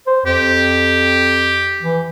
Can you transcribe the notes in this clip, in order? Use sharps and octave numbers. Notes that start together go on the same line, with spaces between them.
C5
F2 G4
E3